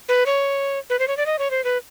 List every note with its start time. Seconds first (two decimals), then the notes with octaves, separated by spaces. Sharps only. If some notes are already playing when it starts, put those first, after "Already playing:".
0.09 B4
0.26 C#5
0.90 B4
0.99 C5
1.08 C#5
1.17 D5
1.26 D#5
1.39 C#5
1.51 C5
1.64 B4